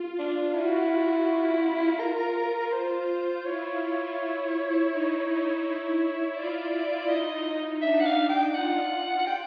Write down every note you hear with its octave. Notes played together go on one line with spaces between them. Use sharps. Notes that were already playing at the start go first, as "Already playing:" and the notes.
Already playing: F4
D4
E4 F#4
F4
F4
F4 A#4
F4 C5
E4 C#5
D#4
E4
F4 D5
E4
D#4 D#5
D4 E5
F#5
F5
G5
F4 F#5
F#5
G5